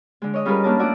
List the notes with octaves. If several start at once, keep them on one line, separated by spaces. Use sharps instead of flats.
D3 G#3
C#5 D#5
G3 C#4 F4 G#4 A#4 B4
A#3 C#4 D4 F#4 A5
F3 A3 D4 E4 F#4 D5